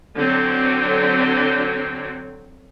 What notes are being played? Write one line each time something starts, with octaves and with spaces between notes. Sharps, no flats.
D3 F#3 C4